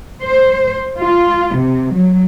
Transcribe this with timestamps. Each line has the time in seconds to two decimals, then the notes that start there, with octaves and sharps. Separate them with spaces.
0.24 C5
0.99 F4
1.56 C3
1.94 F#3